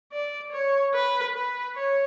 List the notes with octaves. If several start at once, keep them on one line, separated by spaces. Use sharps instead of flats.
D5
C#5
B4
B4
C#5